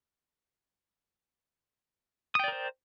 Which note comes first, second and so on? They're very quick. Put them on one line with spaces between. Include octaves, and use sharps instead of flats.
D#6 G5 D5 A#4 C5